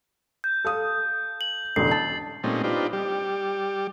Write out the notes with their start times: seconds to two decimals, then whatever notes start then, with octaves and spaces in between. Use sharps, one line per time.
0.44 G6
0.65 A4 F5 D#6
1.41 F#7
1.76 E1 A1 D3 C7
1.91 A5 A6 C7
2.44 A#2 G3 A3 C4 C#4 D#4
2.64 D4 D#4 F4 G4 B4 C5
2.93 G3 G4